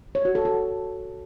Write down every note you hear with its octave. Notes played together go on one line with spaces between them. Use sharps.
C#5
F#4
A4
F#4